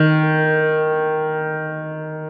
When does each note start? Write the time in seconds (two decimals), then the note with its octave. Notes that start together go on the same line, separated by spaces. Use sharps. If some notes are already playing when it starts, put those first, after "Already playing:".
Already playing: D#3